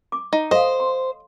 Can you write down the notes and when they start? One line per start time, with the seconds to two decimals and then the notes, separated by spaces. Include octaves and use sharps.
0.12 D6
0.33 D#4
0.51 A4 C5 D#5 F5
0.80 C6